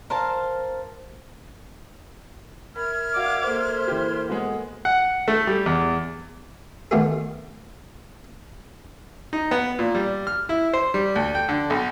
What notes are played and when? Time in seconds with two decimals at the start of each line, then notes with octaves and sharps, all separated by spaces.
0.10 A#4 C5 F5 A5
2.76 A#4 E5 B5 F6 G#6
3.15 F#4 D5 F5 D6
3.47 A#3 A4 A#4 C5
3.88 E3 G4
4.28 G#3 B3 F#4
4.85 F#5
5.28 A3
5.47 G3
5.66 E2
6.91 D#3 A3 B3 F4 G4 G#4
9.33 D#4
9.51 B3
9.79 A#2
9.95 G3
10.27 F6
10.49 E4
10.73 C5
10.94 G3
11.16 D2
11.35 G5
11.49 D3
11.70 B1